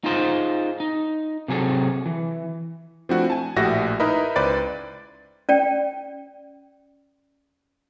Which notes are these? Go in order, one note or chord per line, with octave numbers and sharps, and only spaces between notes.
D#4 F4 G#4 C5
D#4
C3 F#3 G#4 A4
E3
F3 A3 C4 D4 E4 F#4
G#5 A5
A#1 A2 F#4 G4 E5 A#6
D#4 E4 A#4 B4 D#5 E5
C#2 B4 C5 D5 A6 D7
C#4 D5 G5